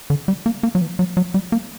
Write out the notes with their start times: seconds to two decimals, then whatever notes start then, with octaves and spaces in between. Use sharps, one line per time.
0.10 D3
0.28 G3
0.46 A#3
0.63 A#3
0.75 F#3
0.81 E3
0.99 F#3
1.17 F#3
1.34 G3
1.52 A#3